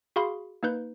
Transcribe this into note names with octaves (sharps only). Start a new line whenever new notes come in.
F#4 G#4 F5 B5 C6
A#3 D#4 B4 G6